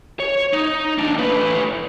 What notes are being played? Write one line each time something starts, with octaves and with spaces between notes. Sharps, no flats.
C#5
D#4
D#2 D4
A2 B4